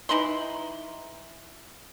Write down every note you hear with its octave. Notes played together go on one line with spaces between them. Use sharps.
E3 D#4 B5 C6